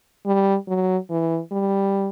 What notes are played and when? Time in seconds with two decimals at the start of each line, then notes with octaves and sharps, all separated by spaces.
0.26 G3
0.68 F#3
1.10 E3
1.52 G3